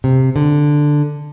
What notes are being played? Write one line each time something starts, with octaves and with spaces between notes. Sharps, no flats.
C3
D3